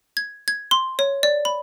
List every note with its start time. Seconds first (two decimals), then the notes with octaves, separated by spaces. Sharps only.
0.17 G#6
0.48 G#6
0.71 C6
0.99 C#5
1.23 D5
1.45 B5